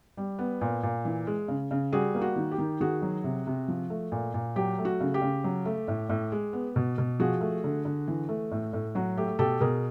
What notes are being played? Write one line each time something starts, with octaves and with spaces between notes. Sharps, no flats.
G3
B3
A#2
A#2
E3
G#3
C#3
C#3
G3 F#4 G#4
A#3
F#4
D#3
G4
D#3
D#3 F#4 G#4
F#3
C3
C3
F3
A3
A#2
A#2
F#3 G4
A3
F#4
C#3
G4
C#3
F#3
A3
A2
A2
G#3
B3
B2
B2
F3 F#4 G#4
A3
D3
D3
E3
A3
A2
A2
F#3 F#4
A3 G4
B2 G4 A4
B2 G#4 A#4